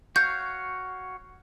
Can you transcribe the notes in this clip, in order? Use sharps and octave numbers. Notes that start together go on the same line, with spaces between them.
F#4 C#5 F5 G6